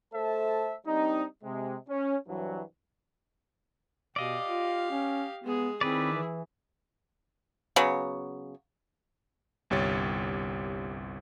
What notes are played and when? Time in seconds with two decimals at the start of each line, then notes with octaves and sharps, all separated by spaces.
0.14 A3 A4 C5 E5 A5
0.87 G3 C4 D4 D#4
1.44 C3 G#3
1.89 C#4
2.28 C2 G2 E3 F#3
4.16 B2 G4 D5 D#5 F5
4.47 F4
4.91 C#4
5.44 G#3 B3 G#4
5.81 D#3 C4 E4 G#4 B4 D5
6.13 E3
7.76 C#3 F#3 B3
9.70 G1 C2 G4 C#5 A6